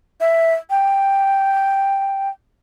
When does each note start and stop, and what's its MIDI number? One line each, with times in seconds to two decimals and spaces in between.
0.20 0.54 76
0.70 2.29 79